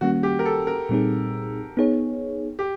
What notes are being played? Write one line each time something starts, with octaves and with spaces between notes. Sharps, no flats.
D#3 G3 A#3 C#4 F#4
G4
A#4
A4
A#4
A#2 G3 C4 D#4 G#4
B3 D#4 G#4 C#5
G4